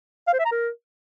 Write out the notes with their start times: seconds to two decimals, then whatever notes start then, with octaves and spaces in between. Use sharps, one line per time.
0.27 F5
0.33 C5
0.39 E5
0.45 A#5
0.51 A#4